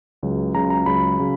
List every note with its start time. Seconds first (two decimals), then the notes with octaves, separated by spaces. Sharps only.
0.23 C#2 C#3 F#3
0.54 C#2 C#3 F#3 A#5
0.70 A#5
0.86 C#2 C#3 F#3 B5
1.19 C#3 F#3